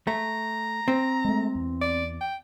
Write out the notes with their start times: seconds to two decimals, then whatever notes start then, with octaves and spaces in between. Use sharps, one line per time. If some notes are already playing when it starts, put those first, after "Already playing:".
0.07 A3 A#5
0.88 C4
1.25 G#3 A3
1.55 E2
1.81 D5
2.21 G5